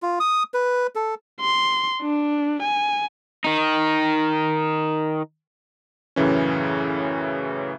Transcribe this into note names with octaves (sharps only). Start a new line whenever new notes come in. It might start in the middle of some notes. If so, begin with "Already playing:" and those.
F4
D#6
B4
A4
C6
D4
G#5
D#3 D#4
F#2 A2 C#3 E3 C#4